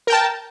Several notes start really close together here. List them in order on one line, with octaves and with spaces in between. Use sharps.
A#4 G5 A5